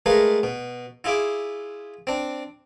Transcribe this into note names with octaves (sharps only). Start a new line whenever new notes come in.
G#3 A3 G#4 A#4 B4 F5
B2
E4 F4 G#4 E5 D6
C4 D4